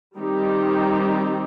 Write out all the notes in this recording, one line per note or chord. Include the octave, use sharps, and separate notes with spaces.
D#3 G3 C4 D#4 G4